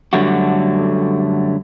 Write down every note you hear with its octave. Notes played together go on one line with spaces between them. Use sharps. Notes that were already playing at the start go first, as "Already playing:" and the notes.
F#2 D3 F#3 G3 A3 F#4